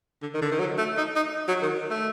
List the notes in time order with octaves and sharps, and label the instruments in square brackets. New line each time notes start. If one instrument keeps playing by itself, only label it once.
[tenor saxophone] D3
D#3
D3
D#3
F#3
A3
D#4
D#4
F#3
D#3
A3